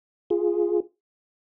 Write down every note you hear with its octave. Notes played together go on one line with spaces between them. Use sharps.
F4 G#4